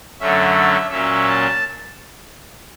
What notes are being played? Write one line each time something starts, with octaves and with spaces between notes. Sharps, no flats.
F#2 D3 F#3 A3 C#4 E5
A#2 F#3 A#3 C#4 E5
A5